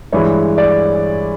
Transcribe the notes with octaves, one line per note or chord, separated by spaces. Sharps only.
G2 E3 G#3 C#5
D5